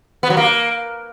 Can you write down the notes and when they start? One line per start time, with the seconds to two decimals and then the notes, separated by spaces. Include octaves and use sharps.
0.23 B3
0.30 F#3
0.37 A#3